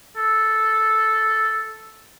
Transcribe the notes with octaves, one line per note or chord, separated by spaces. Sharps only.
A4